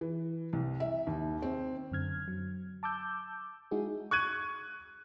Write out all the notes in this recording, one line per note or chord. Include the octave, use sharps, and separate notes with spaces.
E3
C2
E5
D#2
C4
F#2 D3 F6 G#6
F#3
A5 D6 E6 G6
G#3 D#4 E4 F#4 G#4
C#6 F#6 G#6 D#7